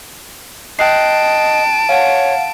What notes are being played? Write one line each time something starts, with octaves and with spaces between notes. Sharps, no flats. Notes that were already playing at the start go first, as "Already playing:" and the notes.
D#5 G5 A5 F#6 C7 D7
C#5 F5 F#5